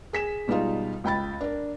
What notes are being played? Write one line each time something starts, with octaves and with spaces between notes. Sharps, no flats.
G#4 B6 E7
B2 G3 G#3 D#4 F4
C#2 G5 B5 A6
D4 A#4